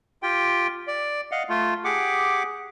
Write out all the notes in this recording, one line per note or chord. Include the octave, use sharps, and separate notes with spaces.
F4 G4 G5
D5
D#5 F5 F#5
A3 F4
G4 G#4 F#5 D6